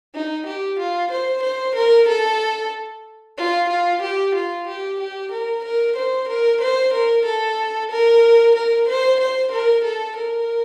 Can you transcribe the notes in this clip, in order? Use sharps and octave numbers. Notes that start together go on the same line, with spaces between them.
D#4
G4
F4
C5
C5
A#4
A4
F4
F4
G4
F4
G4
G4
A#4
A#4
C5
A#4
C5
A#4
A4
A#4
A#4
C5
C5
A#4
A4
A#4